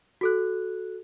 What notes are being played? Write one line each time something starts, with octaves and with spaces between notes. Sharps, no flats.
F#4 A4 F#6